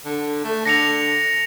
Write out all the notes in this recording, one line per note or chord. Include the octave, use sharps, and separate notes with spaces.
D3
A3
D3 A#6 C#7 F7